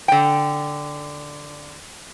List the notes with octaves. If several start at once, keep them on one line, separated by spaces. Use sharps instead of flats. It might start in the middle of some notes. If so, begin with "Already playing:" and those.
D3 G5